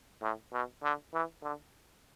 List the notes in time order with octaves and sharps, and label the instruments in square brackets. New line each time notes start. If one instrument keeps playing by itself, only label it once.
[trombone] A2
B2
D3
E3
D3